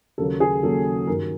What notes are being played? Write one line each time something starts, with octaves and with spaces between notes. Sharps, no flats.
D#2 C#3 F#3 A#3 A4
G#4
D#2 C#3 F#3 A#3 A4
G2 D#3 F#3 A#4